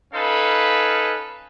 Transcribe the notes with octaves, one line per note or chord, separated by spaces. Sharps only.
C#4 D#4 A4 B4 F5 G#5